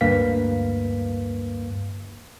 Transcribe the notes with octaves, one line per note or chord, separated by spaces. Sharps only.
D2 G2 A#3 B4 F5 B6